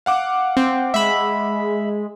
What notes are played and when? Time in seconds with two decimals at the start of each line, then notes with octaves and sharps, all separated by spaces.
0.06 F5 F#5 D6
0.57 C4
0.94 G#3 E5 B5